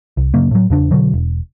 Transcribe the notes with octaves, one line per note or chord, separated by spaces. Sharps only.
C2
D1 F#2 C#3 A#3
A2 F#3
E2 C#3 D4
B2 D3 F#3
E1